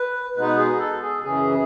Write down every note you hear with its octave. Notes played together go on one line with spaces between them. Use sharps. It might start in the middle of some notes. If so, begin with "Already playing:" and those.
Already playing: B4
B2 G#3 B3 D#4 B4
G#4
A4
G#4
F#2 C#3 E3 G#4